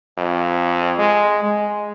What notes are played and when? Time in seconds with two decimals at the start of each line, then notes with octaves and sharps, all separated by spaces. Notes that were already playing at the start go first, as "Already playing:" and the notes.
0.18 F2
0.99 G#3
1.43 G#3